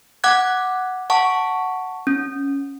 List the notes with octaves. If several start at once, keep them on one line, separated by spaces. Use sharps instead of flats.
F#5 D6 F#6 G#6
F#5 A5 C#6
C#4